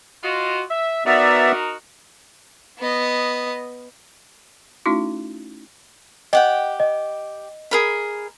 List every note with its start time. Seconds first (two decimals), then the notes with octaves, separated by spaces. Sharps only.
0.24 F4 F#4 D#5
0.70 E5
1.06 B3 D#4 F#4 A#4 D5 E5
2.79 B3 D#5
4.86 A3 C#4 D#4 E4 F#4
6.33 G4 D#5 F#5 G5
6.80 D#5
7.71 G#4 A#4 B5